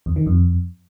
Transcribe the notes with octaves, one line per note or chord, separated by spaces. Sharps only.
E2
D#3
F2